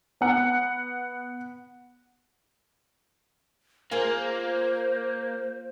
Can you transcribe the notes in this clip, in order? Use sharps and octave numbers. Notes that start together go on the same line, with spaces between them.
B3 F#5
A#3 F4 G#4 A#4 C5